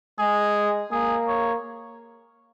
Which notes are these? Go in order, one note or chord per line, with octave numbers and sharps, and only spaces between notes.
G#3 G#4
A#3 G#4
C#5